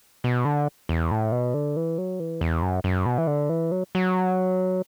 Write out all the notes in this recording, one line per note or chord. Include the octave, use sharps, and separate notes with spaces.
B2
D3
E2
A2
B2
D3
E3
F#3
E3
E2
F#2
F#2
B2
E3
D3
E3
F#3
F#3